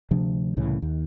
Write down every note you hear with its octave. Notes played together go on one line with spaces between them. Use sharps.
D2 C3 F3 D4
C2 A2 C#3 E3
D#2